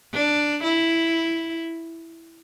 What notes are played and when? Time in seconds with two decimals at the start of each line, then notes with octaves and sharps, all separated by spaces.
0.13 D4
0.63 E4